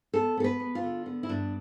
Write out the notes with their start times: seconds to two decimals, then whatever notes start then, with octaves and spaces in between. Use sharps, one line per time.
0.14 B3 A4
0.37 B3 A4
0.44 B4
0.60 B3
0.75 F4
0.83 D3
1.06 B3
1.23 E4
1.29 G2 D4